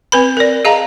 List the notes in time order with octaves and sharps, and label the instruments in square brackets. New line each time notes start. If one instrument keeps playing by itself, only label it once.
[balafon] C4 B4 B5
A#4 D5
G#4 D#5 F5 A5 A#5